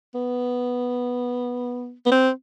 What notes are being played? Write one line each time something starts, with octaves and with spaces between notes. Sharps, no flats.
B3
B3
C4